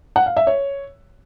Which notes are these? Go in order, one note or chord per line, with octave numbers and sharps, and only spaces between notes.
F#5
F5
E5
C#5